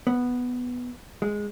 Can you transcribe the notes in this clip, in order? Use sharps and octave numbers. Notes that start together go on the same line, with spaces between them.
B3
G#3